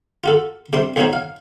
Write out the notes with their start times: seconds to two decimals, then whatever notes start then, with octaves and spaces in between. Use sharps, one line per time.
0.24 F4 F#4 A4
0.73 C3 G3 D4 C6
0.96 B1 F3 C#4 D#4 F#4 C#5
1.13 F5